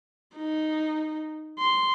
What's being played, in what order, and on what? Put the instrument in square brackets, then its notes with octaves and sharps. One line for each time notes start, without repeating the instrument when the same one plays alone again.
[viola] D#4
C6